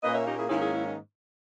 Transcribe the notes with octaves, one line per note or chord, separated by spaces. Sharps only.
A#2 A#3 C#4 B4 D#5
C#5 E5
D#4 G4
E4 G#4
G#2 D#3 A#3 C#4 E4 G#4
E4 G#4
E4
D#4